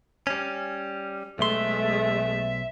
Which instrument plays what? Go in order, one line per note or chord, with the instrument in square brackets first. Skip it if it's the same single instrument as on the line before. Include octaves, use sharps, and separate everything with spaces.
[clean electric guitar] G3 C#4
[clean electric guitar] B1 C6 [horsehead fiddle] G#3 A3 [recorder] E5